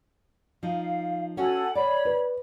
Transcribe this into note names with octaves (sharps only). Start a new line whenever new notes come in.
F3 D#4 F5
C#4 F#4 A4 F#5 G#5
C#5 D5 B5
B4